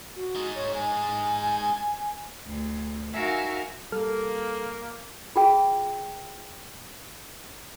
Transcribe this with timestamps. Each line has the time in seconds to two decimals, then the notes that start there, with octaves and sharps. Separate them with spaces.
0.16 F#4
0.36 G#3 D#4
0.55 C#5
0.75 G#5
2.47 D2
3.13 D#4 F#4 A#4 E5 F5 G#5
3.92 G3 A#3 A4 F6
5.36 F4 G#4 G5